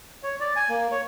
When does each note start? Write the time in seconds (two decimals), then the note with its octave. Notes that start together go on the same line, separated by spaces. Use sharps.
0.23 C#5
0.40 D5
0.56 G#5
0.69 A#3
0.91 C#5